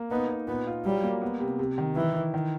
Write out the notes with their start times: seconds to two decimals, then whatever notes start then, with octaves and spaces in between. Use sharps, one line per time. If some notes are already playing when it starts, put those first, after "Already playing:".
Already playing: A#3
0.11 B3 D#4
0.29 D#4
0.47 A#2 B3
0.67 F4
0.85 F#3 G3
1.04 A#3
1.22 B3
1.40 C3
1.59 C3
1.78 D#3
1.96 E3 E4
2.14 E4
2.34 D#3